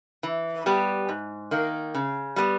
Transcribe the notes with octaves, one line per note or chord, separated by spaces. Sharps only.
E3
G3 B3 G4
G#2
D#3 A#3
C#3
G3 B3